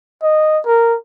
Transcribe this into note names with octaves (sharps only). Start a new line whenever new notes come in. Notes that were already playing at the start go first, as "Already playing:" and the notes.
D#5
A#4